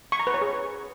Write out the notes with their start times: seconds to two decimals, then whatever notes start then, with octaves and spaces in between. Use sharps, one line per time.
0.12 C#6
0.20 A#5
0.27 B4
0.34 C#5
0.41 G#4